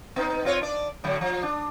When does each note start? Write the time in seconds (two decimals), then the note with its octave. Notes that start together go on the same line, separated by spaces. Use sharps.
0.16 B3 D#4
0.45 C4 F4 C#5
0.61 D4 D5
1.04 A2 D3 F#3
1.21 F3
1.43 D4